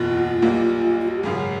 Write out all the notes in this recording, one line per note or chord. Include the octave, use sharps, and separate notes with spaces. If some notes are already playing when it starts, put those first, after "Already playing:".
Already playing: F#1 E2 B2 F4
B1 A#2 G3 A#3
F4
F#4
G4
G#1 F#2 C#3 G#4